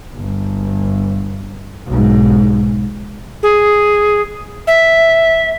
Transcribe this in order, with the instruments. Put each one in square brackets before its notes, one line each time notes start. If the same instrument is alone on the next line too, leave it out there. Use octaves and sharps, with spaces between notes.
[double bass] G1
B1 G#2
[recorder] G#4
E5